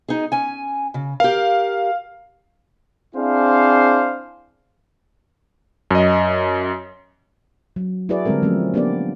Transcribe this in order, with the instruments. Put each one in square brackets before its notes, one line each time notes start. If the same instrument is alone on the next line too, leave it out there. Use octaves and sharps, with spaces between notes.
[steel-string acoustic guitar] D#4 G#4
C#4 G#5
C#3
[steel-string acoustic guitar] G4 A#4 [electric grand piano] F5
[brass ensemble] C4 D4 E4 G#4 C5 F5
[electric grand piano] F#2 D#5
[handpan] F#3
E4 F#4 G#4 B4 D5
D3 G3 G#3 C4 A4 A#4
F3 F#3 A3 C4 C#4
A#3 B3 D4 G4 B4 D5